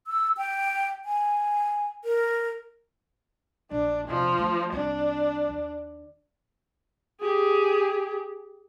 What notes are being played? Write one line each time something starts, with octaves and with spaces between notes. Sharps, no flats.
E6
G5
G#5
A#4
A#1 D4
E2 C3 F3
E3 A3
C2 D4
D#2
G4 G#4